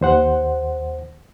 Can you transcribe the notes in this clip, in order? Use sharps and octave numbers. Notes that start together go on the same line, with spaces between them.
D#2 C5 F#5